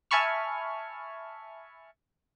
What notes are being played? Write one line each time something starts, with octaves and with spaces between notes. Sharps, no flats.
E5 G#5 A5 B5 C#6 F6